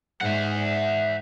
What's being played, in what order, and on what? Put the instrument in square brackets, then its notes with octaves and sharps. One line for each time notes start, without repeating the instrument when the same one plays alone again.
[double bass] G#2 [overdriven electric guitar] E5 F#5